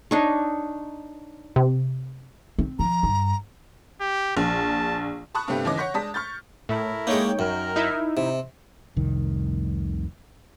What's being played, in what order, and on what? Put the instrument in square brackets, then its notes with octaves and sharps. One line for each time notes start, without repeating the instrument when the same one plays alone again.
[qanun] D4 D#4 C#5
[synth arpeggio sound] C3
[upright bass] C4
[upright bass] F3 [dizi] A#5
[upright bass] G2
[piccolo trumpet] G4
[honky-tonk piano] A#1 [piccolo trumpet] A5
[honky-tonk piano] A5 B5 C#6 D#6 F#6
G2 C3 G3 A3 B3 C4
D#2 C#3 E3 D#5 D6 A#6
C#5 F#5 C#6 G6 B6
G#3 D4 A5 D#6 B6
C#6 F6 G6 A6
[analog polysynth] A2 [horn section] A3 E4 A#4
[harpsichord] G#3 A#3 [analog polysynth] D#4 C#5 G5
[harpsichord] F#2 [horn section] A#4
[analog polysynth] D#4 E4 E5
[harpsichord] C3
[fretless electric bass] F1 C2 D#3